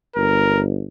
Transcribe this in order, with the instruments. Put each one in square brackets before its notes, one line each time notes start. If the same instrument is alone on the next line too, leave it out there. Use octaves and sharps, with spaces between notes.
[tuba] G1 [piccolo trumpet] A#4